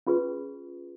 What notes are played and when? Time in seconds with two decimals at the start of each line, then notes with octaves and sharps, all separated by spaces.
0.07 C#4 F4 G#4 B4